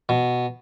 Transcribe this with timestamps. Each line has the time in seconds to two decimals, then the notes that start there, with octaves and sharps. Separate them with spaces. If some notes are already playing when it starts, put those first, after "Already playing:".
0.09 B2